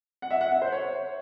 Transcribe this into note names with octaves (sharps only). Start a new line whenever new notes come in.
F#5
E5
F#5
E5
C5
C#5